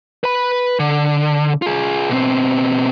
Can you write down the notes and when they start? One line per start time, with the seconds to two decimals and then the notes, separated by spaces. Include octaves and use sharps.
0.24 B4 B5
0.79 D3
1.62 F4 G#4
2.10 B2 C4